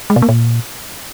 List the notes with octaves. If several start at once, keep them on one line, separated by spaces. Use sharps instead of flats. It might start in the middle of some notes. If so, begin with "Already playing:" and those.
G#3
B2
A#3
A#2